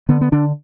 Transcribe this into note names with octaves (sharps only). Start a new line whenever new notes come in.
D3 B3
B3
D3 D4